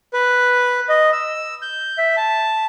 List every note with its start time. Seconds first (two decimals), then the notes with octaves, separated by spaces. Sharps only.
0.13 B4
0.89 D#5
1.13 E6
1.62 G6
1.98 E5
2.17 A5